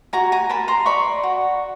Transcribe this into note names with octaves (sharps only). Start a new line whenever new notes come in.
F#4 G#5 A#5
G#5 A#5
A#4 A5 B5
A#5 C6
D5 B5 C#6
F#4